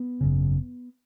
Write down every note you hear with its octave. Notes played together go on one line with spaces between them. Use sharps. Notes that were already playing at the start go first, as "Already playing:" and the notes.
Already playing: B3
G#1 F#2 C#3